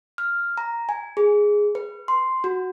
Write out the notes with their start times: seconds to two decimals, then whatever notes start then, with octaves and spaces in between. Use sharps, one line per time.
0.18 F6
0.58 A#5
0.89 G#5
1.17 G#4
1.75 B4
2.08 C6
2.44 F#4